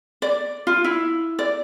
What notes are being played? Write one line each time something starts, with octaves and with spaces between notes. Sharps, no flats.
D5
F4
E4
D5